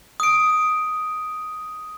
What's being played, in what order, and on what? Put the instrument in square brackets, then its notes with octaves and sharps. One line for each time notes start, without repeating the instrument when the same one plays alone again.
[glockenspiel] D#6 D7